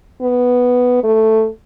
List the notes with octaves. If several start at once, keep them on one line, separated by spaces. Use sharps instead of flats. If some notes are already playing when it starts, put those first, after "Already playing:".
B3
A3